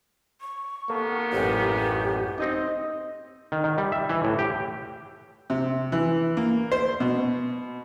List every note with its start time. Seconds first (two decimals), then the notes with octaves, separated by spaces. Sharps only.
0.41 C#6
0.90 C3 D#3 A#3 B3 A4
1.33 A1 F#2 G4
2.39 C4 D#4 D#5
3.52 D#3
3.64 D#3
3.78 G3
3.92 E5
4.09 E3
4.24 A2
4.39 G4
5.50 C3
5.92 E3
6.37 A#3
6.72 C5
7.00 B2